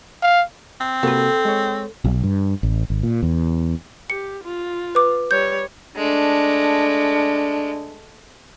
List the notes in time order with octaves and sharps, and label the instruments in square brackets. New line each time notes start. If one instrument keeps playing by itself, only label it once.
[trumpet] F5
[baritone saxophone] C4
[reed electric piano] C3 A#3 F#4 [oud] A4 B4
[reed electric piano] G#3 C#5
[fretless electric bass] B1
G2
A1
G#1
A#2
E2
[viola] G4 [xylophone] C#7
[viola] F4
[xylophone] B4 D6
[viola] G3 C#5 [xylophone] G6
[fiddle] G#3 A3 [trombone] D4